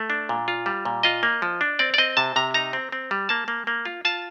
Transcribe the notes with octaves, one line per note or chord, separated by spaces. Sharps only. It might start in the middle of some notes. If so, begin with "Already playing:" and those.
Already playing: A3
D4
A#2
F4
G3
A#2
F4 D#5
A#3
F3
D4
C4 D5
D5
C4 D#5
C3 A5
C3 A#5
D#4 A#5
C4
C4
G3
A#3 A5
A#3
A#3
F4
F4 A5